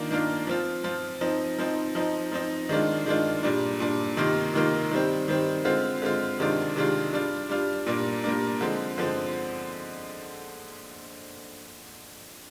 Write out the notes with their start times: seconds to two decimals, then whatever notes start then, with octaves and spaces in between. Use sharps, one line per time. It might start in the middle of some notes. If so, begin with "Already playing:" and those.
Already playing: D#3 A#3 D4 F4
0.10 D#3 A#3 D4 F4
0.47 F3 C4 F4
0.84 F3 C4 F4
1.21 F3 C4 D#4
1.59 F3 C4 D#4
1.95 F3 C4 D#4
2.32 F3 C4 D#4
2.69 D#3 G#3 D4 F4
3.06 D#3 G#3 D4 F4
3.43 A#2 G3 D4
3.80 A#2 G3 D4
4.17 C3 D#3 A#3 F4
4.53 C3 D#3 A#3 F4
4.91 D#3 G3 C4
5.28 D#3 G3 C4
5.65 D3 G#3 C4 F4
6.02 D3 G#3 C4 F4
6.39 C3 D#3 G#3 D4 F4
6.76 C3 D#3 G#3 D4 F4
7.13 G3 D4 F4
7.49 G3 D4 F4
7.87 A#2 G3 A#3 D4
8.24 A#2 G3 A#3 D4
8.61 D3 F3 G#3 C4
8.98 D3 F3 G#3 C4